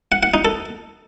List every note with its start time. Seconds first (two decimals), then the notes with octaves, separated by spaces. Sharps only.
0.12 F#5
0.23 F#5
0.34 D#4
0.45 A4